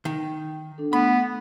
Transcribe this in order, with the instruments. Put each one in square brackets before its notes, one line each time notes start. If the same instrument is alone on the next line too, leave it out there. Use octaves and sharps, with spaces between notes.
[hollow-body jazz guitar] D#3
[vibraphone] D4 A4
[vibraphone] A3 [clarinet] B3 [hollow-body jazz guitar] B5